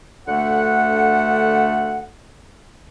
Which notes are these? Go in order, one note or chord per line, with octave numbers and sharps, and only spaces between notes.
D2 D3 A3 F#5